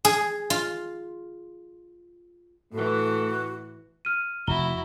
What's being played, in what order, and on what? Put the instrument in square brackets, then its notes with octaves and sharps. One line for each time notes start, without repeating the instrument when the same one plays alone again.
[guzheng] G#4
F4
[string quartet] A2 E3 [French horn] A3 [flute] F#4
[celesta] F6 D#7
[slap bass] F1 [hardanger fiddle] E4 F#4 [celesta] A#5 G7